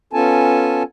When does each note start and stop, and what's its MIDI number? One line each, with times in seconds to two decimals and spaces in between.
0.13 0.83 59
0.13 0.83 61
0.13 0.83 65
0.13 0.83 69
0.13 0.83 80
0.13 0.83 81